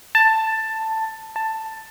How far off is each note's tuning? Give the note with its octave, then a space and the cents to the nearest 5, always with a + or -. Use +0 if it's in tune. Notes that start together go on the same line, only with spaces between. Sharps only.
A5 +10
A5 +10